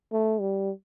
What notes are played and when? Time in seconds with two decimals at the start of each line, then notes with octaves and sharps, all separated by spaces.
0.12 A3
0.40 G3